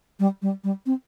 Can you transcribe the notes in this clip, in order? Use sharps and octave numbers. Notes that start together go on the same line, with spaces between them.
G3
G3
G3
C4